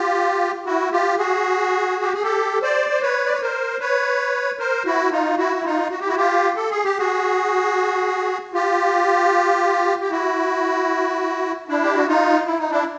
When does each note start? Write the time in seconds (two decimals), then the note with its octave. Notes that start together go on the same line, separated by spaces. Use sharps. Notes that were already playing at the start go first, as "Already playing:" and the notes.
Already playing: F4 G4
0.65 E4 F#4
0.92 F4 G4
1.18 F#4 G#4
2.03 G4
2.13 G#4
2.23 G4 A4
2.62 C5 D5
2.90 C5
3.02 B4 C#5
3.25 D5
3.33 C#5
3.42 A#4 C5
3.80 B4 C#5
4.59 A#4 C5
4.86 E4 F#4
5.11 D#4 F4
5.38 E4 F#4
5.56 E4
5.64 D#4 F4
5.91 F#4
6.00 G4
6.07 E4 F#4
6.16 F4 G4
6.56 A4
6.70 G#4
6.84 G4
6.98 F#4 G#4
8.53 F4 G4
10.01 G4
10.11 E4 F#4
11.68 D4 E4
11.84 G4
11.95 F#4
12.07 D#4 F4
12.46 E4
12.59 D#4
12.70 D4 E4